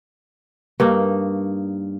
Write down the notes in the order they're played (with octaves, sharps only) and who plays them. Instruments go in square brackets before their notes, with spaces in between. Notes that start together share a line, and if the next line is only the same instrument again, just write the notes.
[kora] G2 A#3 D#4